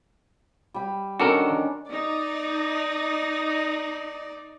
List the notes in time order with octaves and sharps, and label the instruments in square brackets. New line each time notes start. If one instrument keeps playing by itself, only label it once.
[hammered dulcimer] G3 B5
[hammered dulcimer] D#3 C#4 D4 [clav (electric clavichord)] F#4 A4 A#4
[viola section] D#4 [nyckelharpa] D5